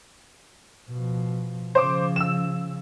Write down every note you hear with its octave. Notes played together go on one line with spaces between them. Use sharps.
B2 F3
C#3 F3 C5 D6
E6 E7